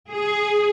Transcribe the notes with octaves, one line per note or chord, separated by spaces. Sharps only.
G#4